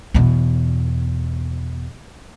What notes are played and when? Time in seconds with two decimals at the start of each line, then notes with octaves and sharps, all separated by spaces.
0.14 E2 B2